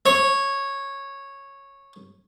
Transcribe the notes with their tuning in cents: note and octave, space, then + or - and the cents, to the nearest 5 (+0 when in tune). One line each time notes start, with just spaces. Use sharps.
C#5 -10